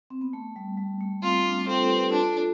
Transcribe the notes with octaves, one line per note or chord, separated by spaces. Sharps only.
C4
B3
A3
G3
G3
A3
C4 F4
D4
C4 F4 A4
A4
G4 B4
D4 F4 A4